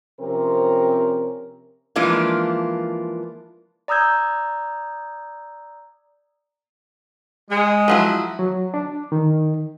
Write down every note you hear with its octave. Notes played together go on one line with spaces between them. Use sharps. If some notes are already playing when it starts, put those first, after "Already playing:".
C3 F3 C4 C#4 A#4
E3 F3 G#3 A#3 D4 F4
D5 A#5 D#6 E6 G6 G#6
G#3
F3 F#3 E4
F#3
D4
D#3